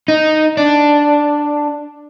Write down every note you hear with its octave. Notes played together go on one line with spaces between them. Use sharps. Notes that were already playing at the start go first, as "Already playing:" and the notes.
D#4
D4